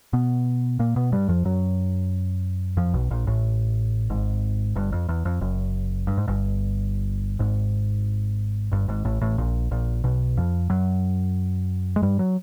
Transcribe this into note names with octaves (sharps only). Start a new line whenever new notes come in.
B2 B3
A#2 A#3
B2 B3
G2 G3
F2 F3
F#2 F#3
F2 F3
B1 B2
A#1 A#2
A1 A2
G#1 G#2
G1 G2
F2
E2
F2
F#1 F#2
G2
G#2
G1 G2
G#1 G#2
G1 G2
G#1 G#2
A1 A2
A1 A2
A#1 A#2
A#1 A#2
B1 B2
F2 F3
F#2 F#3
G#3
G2 G3
F#3